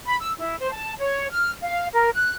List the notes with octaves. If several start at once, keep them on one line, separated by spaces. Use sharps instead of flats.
B5
E6
E4
C5
A5
C#5
F6
F5
A#4
F#6